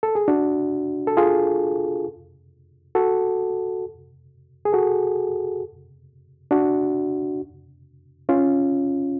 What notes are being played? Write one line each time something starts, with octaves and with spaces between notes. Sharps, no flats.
A4
G#4
D4 F#4
A4
F4 G#4
F#4 A4
G#4
F#4 A4
D4 F#4
C#4 F4